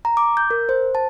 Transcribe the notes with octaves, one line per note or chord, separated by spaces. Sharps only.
A#5
D6
G6
A#4
C5
A5